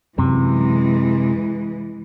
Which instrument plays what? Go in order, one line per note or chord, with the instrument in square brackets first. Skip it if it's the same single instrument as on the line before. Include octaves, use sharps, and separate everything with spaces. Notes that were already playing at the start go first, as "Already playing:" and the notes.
[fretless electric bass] F#2 [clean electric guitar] C3 [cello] E3 G#3